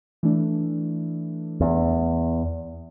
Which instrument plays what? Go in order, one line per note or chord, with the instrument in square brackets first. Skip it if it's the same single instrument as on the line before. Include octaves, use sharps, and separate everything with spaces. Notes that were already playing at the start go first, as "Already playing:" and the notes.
[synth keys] E3 A3 D4
[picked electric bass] E2